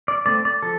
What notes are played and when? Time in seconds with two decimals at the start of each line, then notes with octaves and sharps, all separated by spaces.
0.08 D5
0.26 A3 C4 D5
0.45 D5
0.62 F3 A4